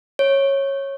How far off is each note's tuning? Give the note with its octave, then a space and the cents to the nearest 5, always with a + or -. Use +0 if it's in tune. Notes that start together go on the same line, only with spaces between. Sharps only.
C#5 -15